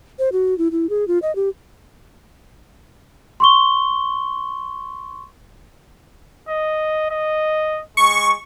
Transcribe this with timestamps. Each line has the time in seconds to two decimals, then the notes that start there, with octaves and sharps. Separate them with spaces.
0.19 C5
0.32 F#4
0.58 E4
0.72 E4
0.90 G#4
1.08 F4
1.22 D#5
1.36 G4
3.40 C6 C#6 G7
6.48 D#5
7.11 D#5
7.97 G#3 C#6